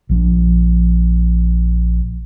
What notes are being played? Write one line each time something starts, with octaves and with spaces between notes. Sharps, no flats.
A#1 F3